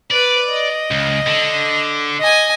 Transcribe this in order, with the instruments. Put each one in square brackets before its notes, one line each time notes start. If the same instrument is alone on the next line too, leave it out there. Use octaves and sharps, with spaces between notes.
[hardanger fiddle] B4 [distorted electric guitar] D5
[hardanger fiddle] D#5
[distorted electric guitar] C#2
D3
[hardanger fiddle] D#5 G#5